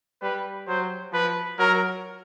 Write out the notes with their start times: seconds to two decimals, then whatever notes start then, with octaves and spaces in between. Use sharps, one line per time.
0.22 G3 B4
0.68 F#3 C5
1.13 F3 B4
1.59 F#3 A#4